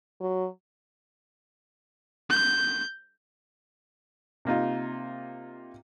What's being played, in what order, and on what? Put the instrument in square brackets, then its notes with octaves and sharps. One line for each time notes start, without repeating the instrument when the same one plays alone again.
[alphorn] F#3
[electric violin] G6
[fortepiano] C3 A#3 D#4 F4